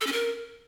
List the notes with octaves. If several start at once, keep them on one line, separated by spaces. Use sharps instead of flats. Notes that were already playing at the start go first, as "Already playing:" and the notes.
A4
C#4
A#4